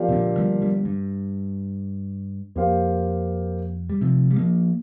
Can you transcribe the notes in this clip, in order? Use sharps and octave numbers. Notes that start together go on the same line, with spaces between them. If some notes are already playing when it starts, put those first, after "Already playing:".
Already playing: F3 A#3 G4 D5 F5
C3
A#2 D3
D3 G3
D3 G3
G2
F2 A#3 G4 C5 F5
G3
C3 F3
G3
F3 A#3